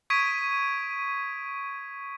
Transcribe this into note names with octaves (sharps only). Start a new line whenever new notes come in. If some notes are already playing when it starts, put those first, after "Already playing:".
C#6 D#6 G#6 B6 D7 D#7